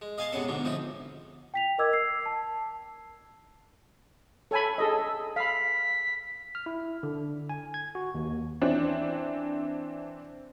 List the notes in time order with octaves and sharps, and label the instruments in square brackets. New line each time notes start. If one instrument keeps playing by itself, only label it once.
[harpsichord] G#3
D#5 F5 G#5 A5 C6
C3 G#3 B3 C#4 A4
G#2 B2 D3
F3 C4 D#4 E4
[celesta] G5 B6 F7
A#4 D#5 D6 E6 G#6
E6 C7
A5
[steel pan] A4 G#5 B5 [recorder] C#5
[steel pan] G#4 A4 D#5 [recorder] E6
[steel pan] F5 B5 [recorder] B6
[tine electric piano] F6
E4
D3
G#5
G#6
F#4
D#2
[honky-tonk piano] E3 C4 D4